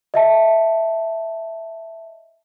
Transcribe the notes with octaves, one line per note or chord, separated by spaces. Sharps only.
D#5 E5 A5